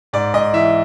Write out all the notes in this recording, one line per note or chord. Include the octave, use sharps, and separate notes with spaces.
G#2 D5
G#2 D#5
E3 E5